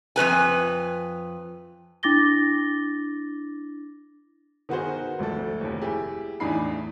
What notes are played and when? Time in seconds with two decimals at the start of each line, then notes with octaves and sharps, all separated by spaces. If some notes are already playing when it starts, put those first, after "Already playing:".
0.16 F2 G#3 B4 G#5
2.03 D4 E4 D6 A6 A#6 G7
4.69 D#3 B3 D#4 F#4 G#4 C5
5.19 G#1 D2 F3 A4
5.61 F1 D#2
5.82 E4 G4 G#4
6.40 E2 A2 D4 D#4 B5 C7